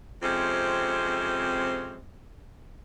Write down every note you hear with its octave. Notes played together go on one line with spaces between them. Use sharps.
F2 C3 G#3 C4 C#4